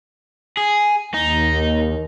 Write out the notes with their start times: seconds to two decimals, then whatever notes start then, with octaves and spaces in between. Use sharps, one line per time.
0.57 G#4
1.14 D#2 D#4